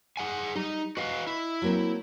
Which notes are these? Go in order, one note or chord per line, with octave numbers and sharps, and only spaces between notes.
G#4 F#5 G#5
G3 D#4
F#4 B4 D#5 F5
E4
F#3 A#3 C4